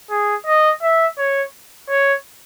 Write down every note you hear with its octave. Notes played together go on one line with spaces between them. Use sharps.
G#4
D#5
E5
C#5
C#5